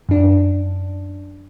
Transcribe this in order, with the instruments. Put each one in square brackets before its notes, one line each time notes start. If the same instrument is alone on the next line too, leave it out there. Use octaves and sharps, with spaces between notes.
[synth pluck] F#2 D4